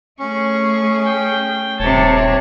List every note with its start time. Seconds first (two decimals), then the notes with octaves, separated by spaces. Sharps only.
0.20 A3 C#4 G#4 C#6
1.05 G5
1.80 D#1 G2 C3 C#5 A5